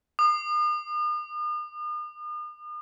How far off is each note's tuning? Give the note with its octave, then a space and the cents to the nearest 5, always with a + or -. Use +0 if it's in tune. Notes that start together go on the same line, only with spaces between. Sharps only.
D#6 -45